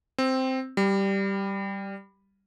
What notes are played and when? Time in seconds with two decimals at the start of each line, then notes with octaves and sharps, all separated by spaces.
0.18 C4
0.77 G3